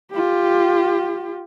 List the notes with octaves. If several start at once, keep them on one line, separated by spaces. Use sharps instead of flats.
F4 G4